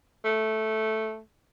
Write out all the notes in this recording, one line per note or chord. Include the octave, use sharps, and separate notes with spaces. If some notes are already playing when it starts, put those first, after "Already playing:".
A3